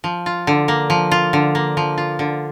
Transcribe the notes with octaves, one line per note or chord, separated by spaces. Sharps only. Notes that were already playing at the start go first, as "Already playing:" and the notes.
F3
F4
D3
A#3
F3
F4
D3
A#3
F3
F4
D3